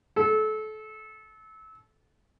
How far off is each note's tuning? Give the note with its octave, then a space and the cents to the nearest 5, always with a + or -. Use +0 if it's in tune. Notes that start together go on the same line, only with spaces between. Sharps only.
A4 -30